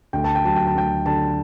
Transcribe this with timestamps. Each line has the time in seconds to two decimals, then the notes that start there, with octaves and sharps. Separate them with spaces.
0.13 D2 G5
0.24 A5
0.35 G5
0.44 F#3 A5
0.56 G5
0.67 A5
0.74 D2 G5
1.06 D3 A5